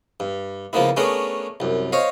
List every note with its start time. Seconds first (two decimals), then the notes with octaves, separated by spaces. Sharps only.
0.20 G2
0.73 C#2 F3 A#3 B3 E4
0.97 A3 B3 C#4 D4 G#4 A#4
1.60 C2 F#2
1.92 C5 C#5 D#5 F5